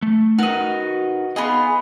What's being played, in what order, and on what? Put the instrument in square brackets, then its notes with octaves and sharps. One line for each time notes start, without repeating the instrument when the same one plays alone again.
[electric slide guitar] A3
[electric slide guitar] D#4 A#4 B4 [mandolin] F#4 D#5
[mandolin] B3 F4 G#4 [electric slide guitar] D#5